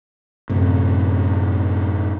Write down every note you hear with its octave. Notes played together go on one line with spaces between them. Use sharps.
F#2 A2 C3